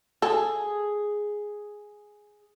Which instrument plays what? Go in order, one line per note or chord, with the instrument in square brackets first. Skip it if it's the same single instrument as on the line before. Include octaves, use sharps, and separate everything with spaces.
[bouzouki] G#4 [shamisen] A4